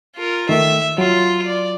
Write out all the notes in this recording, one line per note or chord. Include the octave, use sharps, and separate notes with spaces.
F4 A#4
D#3 A3 E5
F#3 F4
D5